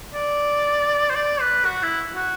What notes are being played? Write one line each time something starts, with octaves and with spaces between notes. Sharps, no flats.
D5
C5
D5
B4
F#4
E4
F#4